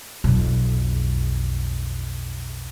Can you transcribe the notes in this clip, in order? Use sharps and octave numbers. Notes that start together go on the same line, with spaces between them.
B1 F2